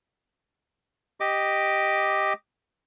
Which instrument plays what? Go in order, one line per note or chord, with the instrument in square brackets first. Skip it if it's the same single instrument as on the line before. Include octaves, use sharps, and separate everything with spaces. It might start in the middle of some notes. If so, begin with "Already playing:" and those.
[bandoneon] G4 D#5 D6